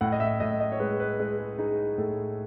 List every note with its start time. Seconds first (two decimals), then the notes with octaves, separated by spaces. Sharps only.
0.01 A2 F#5
0.12 D#5
0.20 E5
0.40 A2 D#5
0.60 D#5
0.72 C#5
0.80 G#3 B4
1.00 B4
1.19 G#3 B4
1.38 G#4
1.58 D#4 G#4
1.98 A2 A4